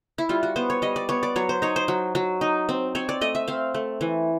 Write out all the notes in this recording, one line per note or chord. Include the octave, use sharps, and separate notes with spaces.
E4
G3 F4
F#4
B3 C5
C#5
G3 D#5
D5
B3 C#5
D5
F#3 C#5
C5
D#4 C#5
C5
F#3
F#3
D#4
C4
C4 C#5
D5
A3 D#5
E5
C4 F5
A3
E3